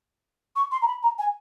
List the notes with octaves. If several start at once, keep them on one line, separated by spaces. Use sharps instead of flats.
C#6
C6
A#5
B5
A#5
G#5